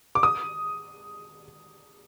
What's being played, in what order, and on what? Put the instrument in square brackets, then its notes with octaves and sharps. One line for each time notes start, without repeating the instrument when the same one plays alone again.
[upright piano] D6
D#6